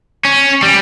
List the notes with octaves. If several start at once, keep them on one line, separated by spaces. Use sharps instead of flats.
C#4
G3